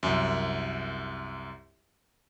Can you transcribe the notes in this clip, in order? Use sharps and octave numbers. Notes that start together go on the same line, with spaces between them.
C2 F#2